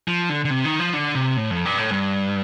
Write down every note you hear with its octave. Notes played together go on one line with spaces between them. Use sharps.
F3
D3
D3
C3
D#3
F3
D3
C3
A2
F2
G2
A2
G2